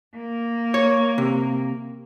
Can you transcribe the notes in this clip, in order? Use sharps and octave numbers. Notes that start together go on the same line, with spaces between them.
A#3
C#5
C3